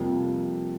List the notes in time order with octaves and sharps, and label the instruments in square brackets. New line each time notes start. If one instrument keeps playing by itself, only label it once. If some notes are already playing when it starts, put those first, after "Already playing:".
Already playing: [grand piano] F2 C3 G3 A#3 F4